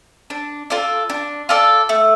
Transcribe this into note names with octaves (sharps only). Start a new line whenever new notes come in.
D4
F4 A4 D5
D4
F4 A4 D5
A3